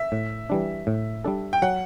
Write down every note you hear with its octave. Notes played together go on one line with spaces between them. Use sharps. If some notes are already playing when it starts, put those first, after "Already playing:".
Already playing: E5
A2
E3 G3 D4
A2
G3 D4 A4
G5
F#3 F#5